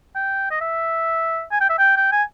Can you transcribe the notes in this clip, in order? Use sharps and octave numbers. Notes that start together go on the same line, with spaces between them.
G5
D#5
E5
G#5
G5
E5
G5
G5
G#5